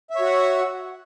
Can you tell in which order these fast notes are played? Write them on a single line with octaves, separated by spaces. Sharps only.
E5 C#5 F#4 F#5